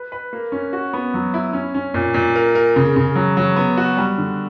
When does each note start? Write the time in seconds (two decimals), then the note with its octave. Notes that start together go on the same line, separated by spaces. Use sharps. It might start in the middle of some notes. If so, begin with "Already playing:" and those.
Already playing: B4
0.12 B4
0.33 A#3
0.52 C#4
0.73 F#4
0.93 B3
1.14 F#3
1.34 E4
1.53 C#4
1.74 C#4
1.94 A#2
2.14 A#2
2.36 A#4
2.55 A#4
2.76 C#3
2.96 C#3
3.15 F#3
3.37 F#3
3.56 B3
3.77 F#4
3.97 G3
4.18 D3